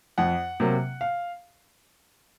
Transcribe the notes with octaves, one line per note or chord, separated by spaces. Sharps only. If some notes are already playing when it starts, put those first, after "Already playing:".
F2 F#5
C3 F#3 A#3
F5